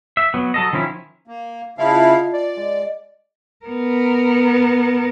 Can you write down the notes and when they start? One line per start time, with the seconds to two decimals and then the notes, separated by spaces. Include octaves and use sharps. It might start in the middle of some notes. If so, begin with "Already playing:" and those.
0.17 E5
0.34 F#3 B3
0.54 F#3 A4 D#5
0.73 D#3 F3 C#4 E4
1.28 A#3
1.78 C#3 E4 F4 D#5 F5 A5
2.33 D5
2.57 G#3
3.66 B3 A#4